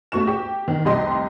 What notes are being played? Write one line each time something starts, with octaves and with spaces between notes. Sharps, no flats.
A3 F#4 C#6 E7
G4
D#3
F1 C2 G4 D#5 C6